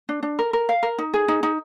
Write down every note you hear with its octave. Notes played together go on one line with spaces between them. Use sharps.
D4
D4
A#4
A#4
F5
A#4
D#4
G#4
D#4
D#4